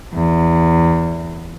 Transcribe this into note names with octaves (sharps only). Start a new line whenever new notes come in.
E2